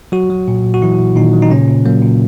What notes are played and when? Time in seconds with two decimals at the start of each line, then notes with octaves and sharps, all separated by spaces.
0.12 F#3 F#4
0.30 F#3
0.48 A#2
0.65 A#2
0.74 F#4
0.82 E3 F#3 E4
1.00 A#2
1.16 A#2 D#3 D#4
1.33 F#3
1.42 D#4
1.50 A#2 C#3 C#4
1.68 A#2
1.86 F#3 A#3
2.02 A#2